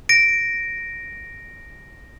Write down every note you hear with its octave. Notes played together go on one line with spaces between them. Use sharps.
A#6 D7